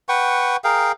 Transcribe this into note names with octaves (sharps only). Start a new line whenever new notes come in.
B4 F#5 G5 C#6
G#4 A#4 F5 G5